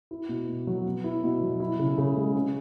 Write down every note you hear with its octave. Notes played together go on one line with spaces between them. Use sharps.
E4
B2
B2
F#3
B3
E4
B2
F#3
E4
C#3
C#3
G#3
C#4